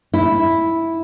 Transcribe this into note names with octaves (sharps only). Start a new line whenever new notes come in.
E4